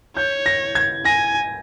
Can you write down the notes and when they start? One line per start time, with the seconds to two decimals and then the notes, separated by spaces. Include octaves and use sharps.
0.16 C#5 G6
0.46 A#6
0.75 G#6
1.05 G#5 A#6